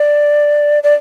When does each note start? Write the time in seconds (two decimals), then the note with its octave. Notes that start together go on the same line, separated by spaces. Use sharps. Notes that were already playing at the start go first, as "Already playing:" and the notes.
Already playing: D5
0.83 D5